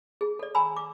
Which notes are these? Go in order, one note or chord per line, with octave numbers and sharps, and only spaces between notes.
G#4
A4 D5
G#5 A#5 B5 E6
D6